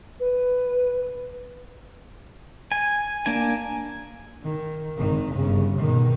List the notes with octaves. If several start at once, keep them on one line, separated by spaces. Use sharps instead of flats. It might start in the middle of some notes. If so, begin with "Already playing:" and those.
B4
G#5
A#3 D4 G#5
D#3
G#1 D#3
G1 C#3
B2 D#3